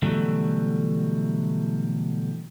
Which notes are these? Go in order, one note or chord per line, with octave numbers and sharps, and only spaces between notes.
B2 D3 E3 F#3 G3 A3